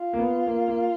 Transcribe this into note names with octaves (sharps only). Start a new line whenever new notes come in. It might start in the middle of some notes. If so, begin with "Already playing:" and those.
Already playing: F4
A#3
B3
A#3
A#3